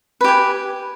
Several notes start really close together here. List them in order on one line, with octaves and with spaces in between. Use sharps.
B4 G4 G#5